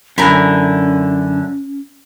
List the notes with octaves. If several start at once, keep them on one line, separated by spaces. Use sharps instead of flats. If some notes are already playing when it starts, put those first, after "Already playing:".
F#2 D3 C#4 E4 G#5 A#5